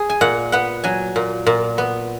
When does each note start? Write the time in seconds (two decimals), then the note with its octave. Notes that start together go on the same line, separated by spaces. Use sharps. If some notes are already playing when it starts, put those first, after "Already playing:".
Already playing: G#4
0.09 G#5
0.21 A#2 F#5
0.52 B3 F#5
0.84 F#3 G#5
1.16 A#2
1.47 A#2
1.78 B3